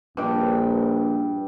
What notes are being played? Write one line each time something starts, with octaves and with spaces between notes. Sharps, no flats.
A#1 G2 G5